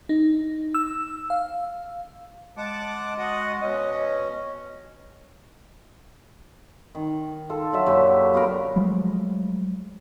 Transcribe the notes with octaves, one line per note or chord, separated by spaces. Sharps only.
D#4
E6
F5
G#3 F#5 A5 D6
F#4 D#5 F#5
B2 C#4 D#5
D#3
F4 A4
D3 F#3 E5
F#2 A#2 G4 A5
B3 F4 F#4 A#4
F3 F#3 G#3 A3